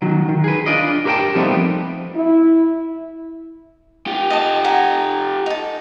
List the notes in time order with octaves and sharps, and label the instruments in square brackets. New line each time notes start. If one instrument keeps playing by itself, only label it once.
[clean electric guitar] D#3 F#3
D#3
G#4 B4
D4 F4 D5 D#5
G4 A#4 C5 F5 G5 A5
F3 G3 A3 B3 C4 D#4
[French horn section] E4
[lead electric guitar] F4 G4
[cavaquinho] D#5 A5
F#5 G#5 A#5
D#4 A4